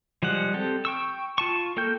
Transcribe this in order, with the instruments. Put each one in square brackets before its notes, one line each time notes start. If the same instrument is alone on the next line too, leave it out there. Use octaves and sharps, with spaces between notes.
[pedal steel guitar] F3 G3 G#3 F#5
C4 G4 A4
G5 C#6 E6
F4 A5 C#6
A#3 A4 A#4 G5 G6